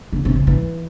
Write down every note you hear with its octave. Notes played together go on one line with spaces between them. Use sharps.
C#3
C3
C#3
E3